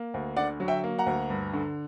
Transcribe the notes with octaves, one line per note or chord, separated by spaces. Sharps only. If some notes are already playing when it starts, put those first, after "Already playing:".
Already playing: A#3
D2
D3 D5 F#5
F#3
E5 G5
A#3
F#5 A#5
D2
G2
D3